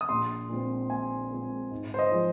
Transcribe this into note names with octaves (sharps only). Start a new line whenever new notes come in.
D#6
A#1 C6
A#2 G#3 C4
A#1 G#5
A#2 G#3 C4
G#2
C5
D#5
F3 G#3